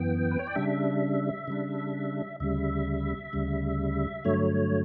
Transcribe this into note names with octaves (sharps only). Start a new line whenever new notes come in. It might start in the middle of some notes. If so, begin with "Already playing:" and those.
Already playing: F#2 E3 B3 G5
B4
C#5
D5
C#3 G3 D4 E5
C#3 G3 D4
D2 C#3 G3 E5
D2 C#3 G3
G2 D3 F#3 A3 C#5